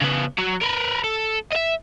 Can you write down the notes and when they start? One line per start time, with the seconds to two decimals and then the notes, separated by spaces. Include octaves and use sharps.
0.01 C#3 B3
0.38 F#3
0.62 A#4 B4
1.04 A4
1.53 D#5 E5